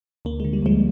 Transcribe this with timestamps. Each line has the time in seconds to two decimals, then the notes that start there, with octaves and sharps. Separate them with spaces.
0.25 D2 A#3
0.40 D3 G#3
0.53 G3
0.62 D2 F3 G#3